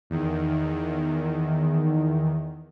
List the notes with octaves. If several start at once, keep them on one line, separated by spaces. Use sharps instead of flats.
E2 D#3